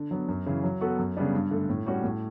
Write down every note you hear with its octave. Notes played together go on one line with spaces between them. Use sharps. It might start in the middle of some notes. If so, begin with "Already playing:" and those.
Already playing: D3
F#3 B3
F#2
C#3 E3
F#3
B3 F#4 A4
F#2
C#3 G3 B3 D4
G2
D3 A3
A2
G3 C#4 F#4
A2